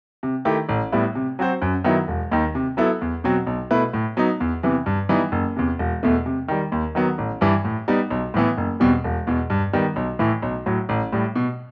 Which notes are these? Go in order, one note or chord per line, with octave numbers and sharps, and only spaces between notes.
C3
D#3 A3 E4 G4
A1
A2 G3 B3 E4
C3
F#3 C4 F#4 C5
F#2
D#3 F#3 B3 E4
E1
D#2 D#3
C3
F#3 B3 E4 A4
E2
B2 F#3 C4
B1
B2 A3 E4 B4
A2
F#3 B3 D#4
E2
C3 E3 B3
G2
E3 G3 B3 D#4
F#1
E2 C3
E1
E2 B2 A3
C3
D#3 G3
D#2
D#3 F#3 B3
A1
G2 E3 G3
A2
G3 B3 D#4
B1
A2 E3 B3
F#1
E2 B2 G3 C4
E1
E2 B2
G2
D#3 G3 B3
B1
A2 E3
B1
A2 F#3
A1
A2 G3
B2